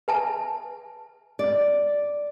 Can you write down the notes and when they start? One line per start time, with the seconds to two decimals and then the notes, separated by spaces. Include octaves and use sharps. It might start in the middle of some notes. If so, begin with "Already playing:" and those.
0.08 B4 G#5 A5
1.39 D5